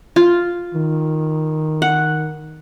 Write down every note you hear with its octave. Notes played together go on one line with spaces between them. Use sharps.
F4
D#3
F#5